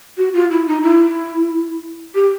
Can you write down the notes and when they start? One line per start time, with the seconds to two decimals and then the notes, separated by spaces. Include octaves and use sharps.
0.17 F#4
0.34 F4
0.51 E4
0.67 D#4
0.83 E4
2.15 G4